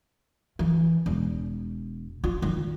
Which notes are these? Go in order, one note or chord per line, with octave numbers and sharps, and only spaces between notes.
E3
E1
F4
D#3